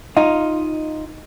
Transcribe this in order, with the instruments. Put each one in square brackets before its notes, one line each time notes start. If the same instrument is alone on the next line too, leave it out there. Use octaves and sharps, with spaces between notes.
[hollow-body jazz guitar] D#4 F4